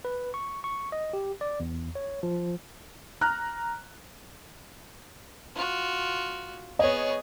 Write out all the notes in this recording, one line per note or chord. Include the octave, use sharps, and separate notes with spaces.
B4
C#6
C#6
D#5
G4
D5
E2
C#5
F3
A#5 F6 F#6
F4 F#4
B3 G#4 C#5 D#5